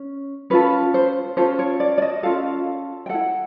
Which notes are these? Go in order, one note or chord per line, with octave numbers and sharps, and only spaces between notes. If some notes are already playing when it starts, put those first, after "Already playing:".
Already playing: C#4
C#4 F4 A4 B4
C5
C#4 F4 A4 C5
C#5
D5
D5
D#5
C#4 F4 A4 F5
G5
E4 A4 F#5